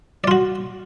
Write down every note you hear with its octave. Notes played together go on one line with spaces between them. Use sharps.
F4 F#4 D5